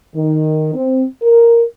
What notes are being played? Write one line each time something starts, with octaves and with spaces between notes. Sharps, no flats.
D#3
C4
A#4